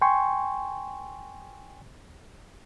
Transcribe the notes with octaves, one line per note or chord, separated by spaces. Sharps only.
G5 G#5 C6 C#6